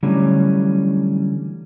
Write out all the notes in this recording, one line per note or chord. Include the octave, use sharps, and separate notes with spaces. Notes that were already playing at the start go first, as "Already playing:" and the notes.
D3 E3 F#3 G3 A3 C#4